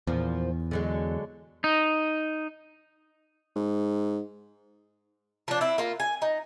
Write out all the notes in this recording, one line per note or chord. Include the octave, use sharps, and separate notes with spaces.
E2 A#2 F3
D3 F#3 G#3
D#4
G#2
F3 D4
C4 E4
A#3 F4
G#5
D#4